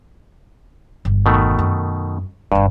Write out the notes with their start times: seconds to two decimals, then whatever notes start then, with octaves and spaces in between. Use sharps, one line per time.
1.05 G1 E2
1.26 B2 D#3 A3
1.59 F#2
2.52 G1 G2 B3